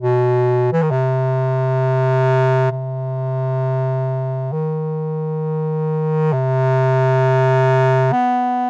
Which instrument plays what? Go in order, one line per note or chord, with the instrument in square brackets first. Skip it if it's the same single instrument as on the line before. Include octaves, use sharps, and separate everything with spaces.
[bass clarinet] B2
E3
D#3
C3
C3
D#3
C3
B3